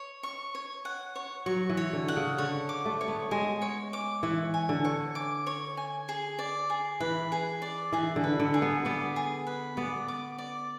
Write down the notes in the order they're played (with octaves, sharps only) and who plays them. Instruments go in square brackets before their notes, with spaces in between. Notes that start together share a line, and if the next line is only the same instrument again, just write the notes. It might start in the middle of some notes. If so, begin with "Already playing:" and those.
Already playing: [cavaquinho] C#5
C#6
C#5
F#5
C#5
[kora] F#3 [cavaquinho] C#6
[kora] E3
[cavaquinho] C#5
[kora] D3
[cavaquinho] F#5
[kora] C#3
[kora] D3 [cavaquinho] C#5
[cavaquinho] D6
[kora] A3
[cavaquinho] C#5
[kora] B3
[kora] G#3 [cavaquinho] G#5
[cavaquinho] C#5
D6
[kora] E3 [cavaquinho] C#5
[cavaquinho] G#5
[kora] D3
[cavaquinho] C#5
D6
C#5
G#5
G#4
D5
G#4
[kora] E3 [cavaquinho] B4
[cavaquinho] G#4
D5
[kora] E3 [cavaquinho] G#4
[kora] D3
[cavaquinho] B4
[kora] D3
[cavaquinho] G#4
[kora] B3
[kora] B3 [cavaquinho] D5
[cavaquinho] G#4
B4
[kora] B3 [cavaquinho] D5
[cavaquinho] D6
D5